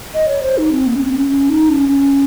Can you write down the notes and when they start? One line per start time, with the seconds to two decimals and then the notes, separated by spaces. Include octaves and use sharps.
0.14 D#5
0.28 C#5
0.43 C5
0.58 D#4
0.72 C4
0.86 A#3
0.96 C#4
1.01 C4
1.16 C#4
1.30 C#4
1.49 D#4
1.69 C#4
1.88 C#4